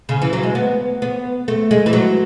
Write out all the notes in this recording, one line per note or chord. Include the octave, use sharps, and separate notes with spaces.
C#3
E3
F#3
G#3
B3
B3
A3
G#3
E3
F#3